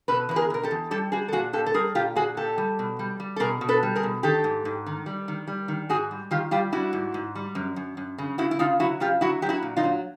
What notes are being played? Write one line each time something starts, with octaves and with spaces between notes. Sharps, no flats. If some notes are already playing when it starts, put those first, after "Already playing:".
B2 A4 B4
E2 B4
G#4 A#4
B2 A#4
G4 A4
E2
G3 G4 A4
G3 F#4 G#4
A4
A#2 F#4 G#4
A#2 G4 A4
A4
G3 G#4 A#4
A#2 F4 G4
A#2 F#4 G#4
A#2 G4 A4
G3
B2
G3
G3
A4
B2 G#4 A#4
B2
A4 B4
G3
G#4 A#4
B2
D#3 G4 A4
G#2
G#2
D#3
G3
D#3
G3
D#3
G#2 F#4 G#4
G3
D#3 F4 G4
G3 F4 G4
G3 E4 F#4
G#2
G#2
G3
F#2
F#2
F#2
C#3
C#3 E4 F#4
E4
C#3 D#4 F4
F#3 E4 F#4
C#3 F4 G4
F#3 E4 F#4
F#3 G4
E4 F#4
A#2
D#4 F4
F#3